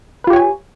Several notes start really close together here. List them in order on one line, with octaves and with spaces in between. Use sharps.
B4 F4 G4 C#5 G#5